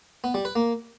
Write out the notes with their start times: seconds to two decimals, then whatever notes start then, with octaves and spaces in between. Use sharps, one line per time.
0.24 B3
0.34 G3
0.45 B4
0.56 A#3